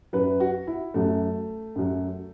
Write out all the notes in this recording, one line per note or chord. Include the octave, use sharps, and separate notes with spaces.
F#2 F#3 B4
F#4
E4
F#2 F#3 A3
F#2 F#3